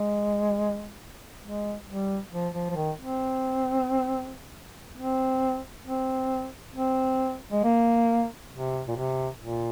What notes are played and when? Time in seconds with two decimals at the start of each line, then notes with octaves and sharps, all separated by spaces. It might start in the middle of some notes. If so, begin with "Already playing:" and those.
Already playing: G#3
1.43 G#3
1.88 G3
2.33 F3
2.54 F3
2.70 F3
2.76 D#3
2.99 C4
4.98 C4
5.87 C4
6.75 C4
7.52 G#3
7.64 A#3
8.52 C3
8.88 A#2
8.97 C3
9.41 A#2